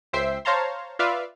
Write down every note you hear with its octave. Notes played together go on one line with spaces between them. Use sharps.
C#2 C5 E5 G5 C7
C5 C#5 F5 A5 A#5 C6
F4 B4 D5 E5 F5